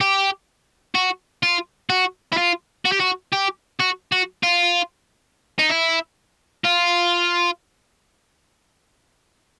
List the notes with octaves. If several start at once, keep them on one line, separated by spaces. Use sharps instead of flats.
G4
F#4
F4
F#4
E4
F4
F#4
G4
F#4
G4
F#4
F#4
F4
D#4
E4
F4